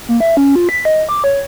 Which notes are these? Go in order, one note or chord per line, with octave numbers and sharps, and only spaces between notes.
A#3
E5
C#4
F4
B6
D#5
D6
C#5